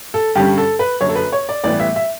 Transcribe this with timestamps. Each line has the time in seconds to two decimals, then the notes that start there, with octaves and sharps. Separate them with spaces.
0.14 A4
0.35 G2 D3 G3 C#4 G4
0.58 A4
0.79 B4
1.01 F#1 F#2 D3 C#5
1.09 A4
1.16 B4
1.32 C#5
1.49 D5
1.64 A1 A2 E3 G3 B3 D5
1.80 E5
1.96 E5